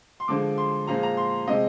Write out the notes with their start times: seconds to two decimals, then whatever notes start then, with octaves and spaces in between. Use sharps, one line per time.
0.20 C6
0.28 D3 F3 G#3 D6
0.58 C6
0.87 A#2 F3 G#3 A#5
1.03 A#5
1.17 C6
1.47 C3 F3 G#3 D#5